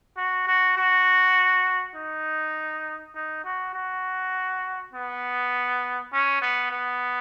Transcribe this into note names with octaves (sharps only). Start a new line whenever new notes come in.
F#4
F#4
F#4
D#4
D#4
F#4
F#4
B3
C#4
B3
B3